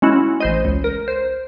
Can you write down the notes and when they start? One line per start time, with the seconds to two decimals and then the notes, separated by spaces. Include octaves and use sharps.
0.02 G#3 C#4 E4 F#4
0.40 A1 C5 D#5
0.65 C#2
0.84 A#4
1.08 C5